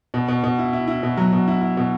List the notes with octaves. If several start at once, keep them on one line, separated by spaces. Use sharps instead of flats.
B2
B2
B2
E4
E4
E4
B2
F#3
B2
E4
E4
B2